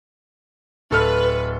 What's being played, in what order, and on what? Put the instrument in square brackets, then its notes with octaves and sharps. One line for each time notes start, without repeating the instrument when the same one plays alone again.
[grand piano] D1 A4 F6 [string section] B4